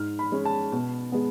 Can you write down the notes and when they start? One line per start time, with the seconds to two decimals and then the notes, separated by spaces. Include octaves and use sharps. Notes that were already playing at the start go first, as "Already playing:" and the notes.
Already playing: G#2 F6
0.19 B5
0.32 G#3 C#4
0.45 A5
0.72 B2
1.12 G#3 B3